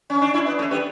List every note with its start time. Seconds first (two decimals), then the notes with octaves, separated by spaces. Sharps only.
0.10 C#4
0.22 D4
0.34 C#4 E4
0.46 B3 D4
0.59 A3 C#4
0.71 G3 B3